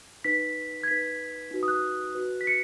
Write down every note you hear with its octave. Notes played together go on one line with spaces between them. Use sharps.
D#4 B4 B6
G#6
D#4 B4 B6
D#4 F#4 B4
D#6
F#6
F#4 B4
B6
C#7